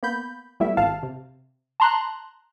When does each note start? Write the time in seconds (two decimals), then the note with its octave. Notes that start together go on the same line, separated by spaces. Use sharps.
0.03 A#3 B3 B5 G6
0.60 G3 A3 B3 E4 E5
0.77 G#1 F5 A5
1.03 C3
1.80 A5 A#5 C6 F#6